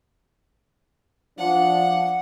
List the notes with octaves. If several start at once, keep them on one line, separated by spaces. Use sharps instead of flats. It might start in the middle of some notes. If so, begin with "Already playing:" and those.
F3 D4 F#5